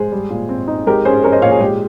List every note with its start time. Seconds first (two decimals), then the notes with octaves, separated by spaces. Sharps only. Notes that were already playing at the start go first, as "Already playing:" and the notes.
Already playing: G#3 G#4 C5
0.12 G3
0.30 A#2
0.49 C4
0.68 D#4
0.87 G#3 G4 A#4
1.05 C#4 G#4 C5
1.23 C#4 A#4 C#5
1.32 C5 D#5
1.41 A#2 C#5 F5
1.51 G#4
1.60 G#3 G4